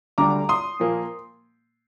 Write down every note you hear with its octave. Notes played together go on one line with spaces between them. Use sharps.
D2 D3 G3 D4 A#5 D6
C6 D#6
A#2 F3 A#3